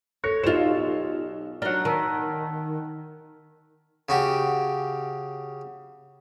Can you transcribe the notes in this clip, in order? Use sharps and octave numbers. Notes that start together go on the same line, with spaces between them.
A4 A#4 C#5 F#6 A#6 C#7
B1 F4 G4 C5 D5 E7 F7
F#3 D4 A#4 F#5 F#6 G7
D#3 A5 E6 B6
C#3 F#4 G4